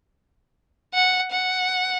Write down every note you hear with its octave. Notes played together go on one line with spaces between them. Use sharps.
F#5
F#5